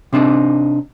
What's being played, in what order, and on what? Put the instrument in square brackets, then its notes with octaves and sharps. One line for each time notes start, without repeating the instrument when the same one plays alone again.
[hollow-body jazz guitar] C3 C4 D4 D#4